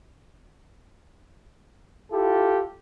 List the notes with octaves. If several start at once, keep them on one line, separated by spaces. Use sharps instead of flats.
E4 F4 G4 A4